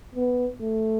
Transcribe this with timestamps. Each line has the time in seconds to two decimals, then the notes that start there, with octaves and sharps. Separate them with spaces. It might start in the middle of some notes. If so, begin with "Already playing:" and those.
0.16 B3
0.61 A3